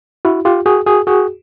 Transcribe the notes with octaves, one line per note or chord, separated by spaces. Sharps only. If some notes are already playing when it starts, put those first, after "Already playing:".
E4 F#4
F4 G4
F#4 G#4
F#4 G#4
F#4 G#4